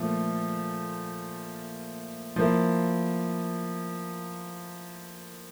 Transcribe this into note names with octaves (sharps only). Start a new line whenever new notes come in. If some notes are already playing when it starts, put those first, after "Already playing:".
Already playing: A#2 F3 A3
F3 A#3 E4